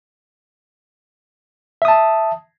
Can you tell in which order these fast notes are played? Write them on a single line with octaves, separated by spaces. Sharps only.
E5 D#6 A5